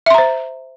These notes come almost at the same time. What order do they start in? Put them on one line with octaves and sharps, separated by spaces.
E5 C6 A#5 C5